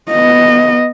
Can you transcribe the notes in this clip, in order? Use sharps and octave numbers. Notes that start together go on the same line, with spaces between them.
B3 D#5